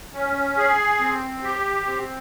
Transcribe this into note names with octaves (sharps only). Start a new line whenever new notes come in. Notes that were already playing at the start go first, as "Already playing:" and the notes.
C#4
G#4
C4
G4
C4